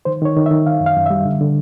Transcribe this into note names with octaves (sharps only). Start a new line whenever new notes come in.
D#3 C5
D#3 C#5
D#3
E5
D#3
D#3 F5
F#2
F5
F#2
G3 E5
D3
D3